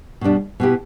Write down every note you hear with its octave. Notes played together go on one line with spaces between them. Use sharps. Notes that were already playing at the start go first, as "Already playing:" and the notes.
B2 G3 D4
B2 B3 E4 G4